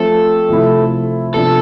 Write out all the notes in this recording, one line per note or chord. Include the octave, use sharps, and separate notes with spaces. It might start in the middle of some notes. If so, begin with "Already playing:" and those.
Already playing: F3 A3 C4 A4
C3 F3 A3 E4
C3 F3 B3 D4 F4 A4